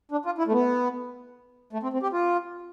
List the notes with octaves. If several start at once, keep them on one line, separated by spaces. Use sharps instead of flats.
D4
F4
E4
A3
B3
A3
C4
C4
G4
F4